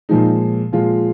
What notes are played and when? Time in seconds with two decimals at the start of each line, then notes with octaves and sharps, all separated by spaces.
0.09 A#2 F3 G#3 D#4
0.73 A#2 F3 G#3 F4